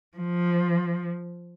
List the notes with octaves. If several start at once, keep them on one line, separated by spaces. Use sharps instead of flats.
F3